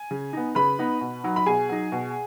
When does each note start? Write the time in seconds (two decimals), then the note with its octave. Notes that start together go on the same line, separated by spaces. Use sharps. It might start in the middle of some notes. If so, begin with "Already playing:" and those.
Already playing: G#5
0.11 C#3
0.33 B3 D#4
0.55 C#3 B4 B5
0.79 B3 D#4
1.01 B2
1.24 F#3 D#4
1.36 B5
1.46 B2 G#4 G#5
1.69 F#3 D#4
1.92 B2